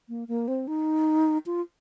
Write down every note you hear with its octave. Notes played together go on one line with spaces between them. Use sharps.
A#3
A#3
C4
D#4
F4